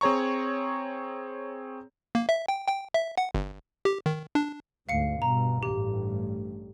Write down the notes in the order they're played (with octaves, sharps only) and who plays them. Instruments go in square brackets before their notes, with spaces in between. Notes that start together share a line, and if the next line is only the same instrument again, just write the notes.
[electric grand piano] C4 G#4 C#5 A#5 C#6
[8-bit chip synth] A#3
E5
G5
G5
E5
F#5
G1
G4
D#3
D4
[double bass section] D2 G#2 [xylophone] F5 C#7
[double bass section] G2 B2 [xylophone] A#5
[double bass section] A1 G2 [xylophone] G4